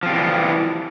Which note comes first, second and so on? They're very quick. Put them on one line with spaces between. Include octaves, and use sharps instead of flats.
F3 C4 G3 E3